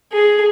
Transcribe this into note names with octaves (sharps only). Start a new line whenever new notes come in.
G#4